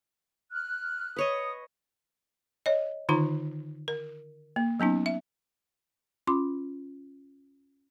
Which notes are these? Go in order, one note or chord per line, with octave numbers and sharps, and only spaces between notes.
F6 F#6
B4 C#5 D#5 D#6
C#5 D#5
D3 D#3 D#4 F4 A#5
A#4
A#3
F#3 B3 C#4 D#4
E5
C#4 F4 C6 D6